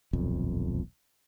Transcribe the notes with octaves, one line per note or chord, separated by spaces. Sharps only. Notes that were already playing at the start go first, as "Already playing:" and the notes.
D#1 B1 F2